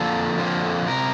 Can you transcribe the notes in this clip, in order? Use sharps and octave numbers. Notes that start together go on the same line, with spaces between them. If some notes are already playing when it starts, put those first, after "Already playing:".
Already playing: F2 D3 F3 A#3 A4
F2 D3 F3 A#3
C3 A#4